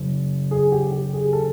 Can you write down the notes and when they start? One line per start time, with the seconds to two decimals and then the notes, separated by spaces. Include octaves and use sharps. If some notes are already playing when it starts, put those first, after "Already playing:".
Already playing: F#1
0.51 G#4
0.72 G4
0.92 G4
1.14 G#4
1.33 A4